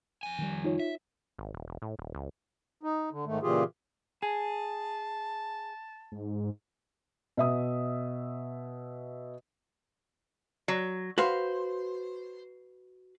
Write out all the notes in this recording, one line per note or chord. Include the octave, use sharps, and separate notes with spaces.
F2 G#5
D#3 F#3 G3
D#4 F4 C#5
E5
G#1
D#1
E1
A2
D#1
C#2
D#4
D3
G#2 D#3 A3
A#2 C#3 E3 F4 G4 G#4
G#4 A5
G#2
B2 E5 D#6
F#3
F#4 B4 C5 F5